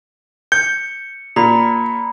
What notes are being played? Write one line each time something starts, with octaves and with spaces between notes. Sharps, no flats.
G6 C#7
A#2 A#5 B5